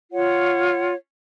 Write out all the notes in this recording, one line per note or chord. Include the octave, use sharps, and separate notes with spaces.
F4 C#5 F#5